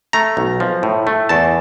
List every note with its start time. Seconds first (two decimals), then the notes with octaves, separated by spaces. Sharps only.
0.13 A3 A#5
0.37 B1
0.60 F3
0.83 A2
1.07 A3
1.29 E2 A5